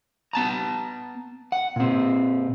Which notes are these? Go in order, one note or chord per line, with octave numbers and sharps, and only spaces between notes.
B3 A5 A#5
F#5
A#2 C4